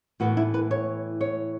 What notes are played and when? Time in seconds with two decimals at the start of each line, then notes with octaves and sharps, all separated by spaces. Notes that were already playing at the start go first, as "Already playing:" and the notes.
0.20 A2 E3 B3 F#4
0.37 E4
0.54 B4
0.71 C#5
1.21 C#5